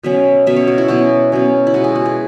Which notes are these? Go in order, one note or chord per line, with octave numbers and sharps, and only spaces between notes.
B2 F#3 C#4 E5
B2 F#3 C#4 E5
C#5
F#4
E4
B2 F#3 C#4 F#4
B2 F#3 C#4
E4
B2 G#3 B3 F#4
G#4
F#4
G#4